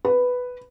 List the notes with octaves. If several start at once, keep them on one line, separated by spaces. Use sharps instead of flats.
B4